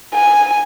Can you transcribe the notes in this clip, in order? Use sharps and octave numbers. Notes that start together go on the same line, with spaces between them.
G#5